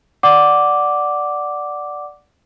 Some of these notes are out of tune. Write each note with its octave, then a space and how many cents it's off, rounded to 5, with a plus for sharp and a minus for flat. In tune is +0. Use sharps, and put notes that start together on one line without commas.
D5 +0 F#5 +0 D6 -5